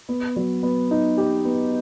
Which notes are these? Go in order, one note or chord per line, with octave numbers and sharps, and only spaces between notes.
B3
F#3
B3
D#4
G4
B3